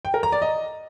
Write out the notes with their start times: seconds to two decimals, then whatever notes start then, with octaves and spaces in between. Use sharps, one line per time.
0.05 G5
0.14 A#4
0.23 A#5
0.32 D5
0.42 D#5